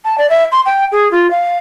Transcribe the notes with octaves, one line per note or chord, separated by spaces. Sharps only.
A5
D5
E5
C6
G5
G#4
F4
F5